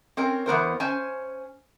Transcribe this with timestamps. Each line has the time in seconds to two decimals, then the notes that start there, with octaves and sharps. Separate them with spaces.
0.17 C4 C#4 A#4
0.46 E2 B3 A#4 C5
0.80 C#4 C5 G#5